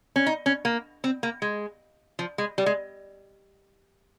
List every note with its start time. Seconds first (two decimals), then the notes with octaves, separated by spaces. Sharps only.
0.16 C#4
0.26 D#4
0.46 C#4
0.65 A#3
1.04 C4
1.23 A#3
1.42 G#3
2.19 F3
2.38 G#3
2.58 G3
2.66 G#3